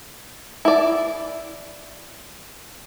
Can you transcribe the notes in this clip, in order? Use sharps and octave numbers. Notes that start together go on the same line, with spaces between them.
E4 D5